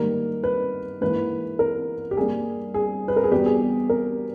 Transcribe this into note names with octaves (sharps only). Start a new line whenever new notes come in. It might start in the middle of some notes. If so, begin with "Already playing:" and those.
Already playing: G#2 D#3 G3 A#3 A#4
B4
G#2 E3 A#3 B4
A#4
G4
G2 G3 A#3 G#4
G#4
B4
A#4
G#4
E2 B2 G3 B3 G4
G#4
A#4